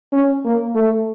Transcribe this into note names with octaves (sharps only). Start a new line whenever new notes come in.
C#4
A#3
A3